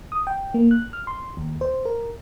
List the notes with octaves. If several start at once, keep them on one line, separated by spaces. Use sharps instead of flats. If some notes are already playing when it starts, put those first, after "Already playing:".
D#6
G5
A#3
F#6
F6
C6
D#2
C5
A#4